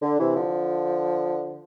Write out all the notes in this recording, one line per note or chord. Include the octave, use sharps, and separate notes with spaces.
D3
C3 E3
D3 F3